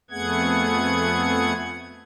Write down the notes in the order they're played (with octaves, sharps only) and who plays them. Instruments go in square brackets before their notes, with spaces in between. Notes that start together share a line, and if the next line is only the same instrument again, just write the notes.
[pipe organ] F2 A3 B3 G#4 F#5 G#6